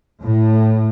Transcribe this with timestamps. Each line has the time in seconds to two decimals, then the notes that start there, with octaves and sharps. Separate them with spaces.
0.25 A2